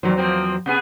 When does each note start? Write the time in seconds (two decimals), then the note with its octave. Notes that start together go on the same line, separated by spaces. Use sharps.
0.03 E2 A#2 D#3 F#3 C5
0.17 F3 A#3 C4
0.66 C3 B3 G#4